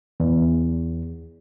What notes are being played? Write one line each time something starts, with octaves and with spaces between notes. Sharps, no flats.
E2